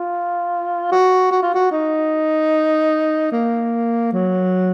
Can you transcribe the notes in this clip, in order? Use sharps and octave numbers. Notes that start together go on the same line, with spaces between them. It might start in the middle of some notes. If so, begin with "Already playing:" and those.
Already playing: F4
F#4
F#4
F4
F#4
D#4
A#3
F#3